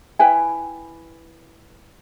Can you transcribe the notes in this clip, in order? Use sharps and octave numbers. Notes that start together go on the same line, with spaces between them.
E4 B4 G5 G#5